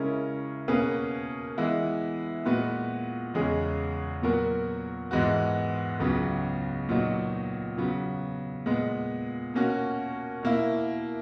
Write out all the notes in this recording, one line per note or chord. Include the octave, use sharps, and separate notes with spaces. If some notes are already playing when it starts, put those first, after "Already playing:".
Already playing: C#3 G#3 C#4 E4 A#4
B2 A#3 C#4 G#4 B4
E3 G#3 B3 E4
A#2 G#3 B3 F#4 B4
E2 C#3 G#3 C#4 G#4
A#2 F#3 B3 F#4 A#4
G#2 E3 G#3 B3 F#4
C#2 C#3 F#3 B3
A#2 F#3 B3 D#4
C#3 F#3 B3
A#2 G#3 B3
B2 A#3 C#4 F#4
B2 A#3 E4